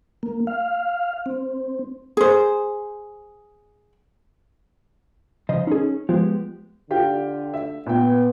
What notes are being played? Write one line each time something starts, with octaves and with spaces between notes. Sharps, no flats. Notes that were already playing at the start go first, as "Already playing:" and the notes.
A#3
F5
C4
G#4 C5
C#3 F3 C5 D#5
C#4 D#4 G#4
F3 G#3 B3 G4
D3 F4 G4 G5
E5
A#2 B3 G5